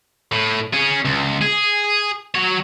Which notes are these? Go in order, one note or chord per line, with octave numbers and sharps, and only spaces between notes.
A2
C#4 G#4
C#2
G#4
F#3 C#5